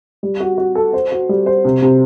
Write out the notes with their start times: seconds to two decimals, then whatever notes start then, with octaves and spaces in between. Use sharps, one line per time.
0.23 G3
0.40 F#4
0.58 F#4
0.75 A4
0.93 C5
1.12 F#4
1.29 G3
1.46 C5
1.65 C3
1.82 C3